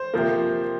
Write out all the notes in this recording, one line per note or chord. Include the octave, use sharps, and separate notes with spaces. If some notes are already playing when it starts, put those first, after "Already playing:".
Already playing: C5
C3 F3 A#3